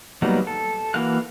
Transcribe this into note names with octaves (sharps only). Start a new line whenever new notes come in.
F#3 G3 A#3 B3 D#4
A4
E3 A#3 F#4 F5 F#6